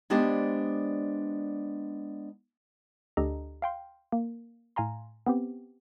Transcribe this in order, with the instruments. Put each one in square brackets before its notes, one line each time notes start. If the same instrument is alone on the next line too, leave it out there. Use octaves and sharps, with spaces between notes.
[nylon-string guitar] G#3 B3 D4 G4 C5 D5
[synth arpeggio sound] D2 D4 G4 A4 D#5 A#5
F5 G5 C6
A#3
A2 F5 G#5 A#5 C6
B3 C4 G4